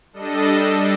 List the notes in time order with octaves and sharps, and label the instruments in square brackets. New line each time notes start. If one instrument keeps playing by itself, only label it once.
[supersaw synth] G3 D4 A4 D#5